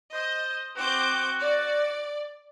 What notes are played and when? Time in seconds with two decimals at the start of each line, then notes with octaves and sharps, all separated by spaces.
0.13 C5 D#5
0.77 C4 F#4 D6 G6
1.41 D5